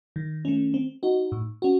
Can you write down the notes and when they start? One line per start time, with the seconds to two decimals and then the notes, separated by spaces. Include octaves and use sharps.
0.16 D#3
0.45 A3 C#4
0.74 C4
1.03 D#4 F#4
1.32 A2
1.62 C#4 F#4